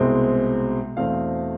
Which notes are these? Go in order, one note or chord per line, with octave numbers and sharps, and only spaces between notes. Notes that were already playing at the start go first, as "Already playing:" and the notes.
Already playing: C2 B2 G#3 C4
E2 B2 A3 C4 F5